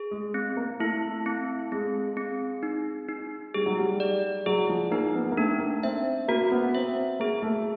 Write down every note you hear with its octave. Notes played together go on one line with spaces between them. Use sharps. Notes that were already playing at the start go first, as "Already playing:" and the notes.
Already playing: G#4
G#3
C4
A#3
A3 E4
C4
G#3 C4
C4
D#4
D#4
G3 G#4
F#3
G3
D5
F#3 G#4
F3
A#3 D#4
B3
A#3
A3 D4
A#3
C4 E5
A#3 F#4
B3
C4 E5
A#3 G#4
A3